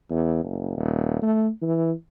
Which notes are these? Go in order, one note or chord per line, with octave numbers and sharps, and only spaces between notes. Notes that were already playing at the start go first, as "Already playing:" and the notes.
E2
F#1
D#1
A3
E3